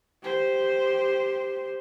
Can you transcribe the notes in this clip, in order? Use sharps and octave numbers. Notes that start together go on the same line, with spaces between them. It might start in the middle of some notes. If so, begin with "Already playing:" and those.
G4 C5